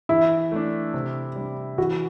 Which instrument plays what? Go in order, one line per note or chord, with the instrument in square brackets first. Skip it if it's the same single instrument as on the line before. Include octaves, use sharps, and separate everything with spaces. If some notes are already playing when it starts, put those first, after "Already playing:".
[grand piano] E3 [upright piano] E4
[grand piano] A3 D4
C3
G3 D4
[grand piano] E3 [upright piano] F#4